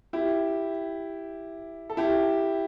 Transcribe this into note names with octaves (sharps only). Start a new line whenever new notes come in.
E4 G4
A4
E4 G4